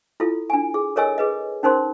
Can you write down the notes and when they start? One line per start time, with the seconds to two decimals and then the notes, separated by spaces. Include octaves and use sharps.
0.20 E4 F4 A4
0.50 D4 G#5
0.74 G#4
0.96 A4 A#4 C#5 D#5 G#5 E6
1.18 G#4 B4 D#5
1.63 C#4 D#4 A#4 C5 C6